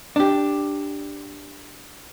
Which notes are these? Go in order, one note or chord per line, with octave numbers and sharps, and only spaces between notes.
D4 G4